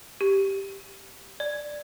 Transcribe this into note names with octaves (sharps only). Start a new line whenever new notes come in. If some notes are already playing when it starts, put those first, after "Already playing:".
G4
D5